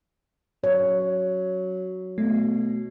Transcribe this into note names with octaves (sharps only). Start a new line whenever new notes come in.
F#3 C#5
B2 A3